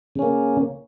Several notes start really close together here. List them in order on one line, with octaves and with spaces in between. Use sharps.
C#3 C#4 A#3